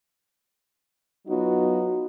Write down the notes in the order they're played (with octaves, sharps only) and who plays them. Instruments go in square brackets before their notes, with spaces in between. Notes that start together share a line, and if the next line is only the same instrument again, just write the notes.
[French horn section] F#3 B3 D#4 F4 F#4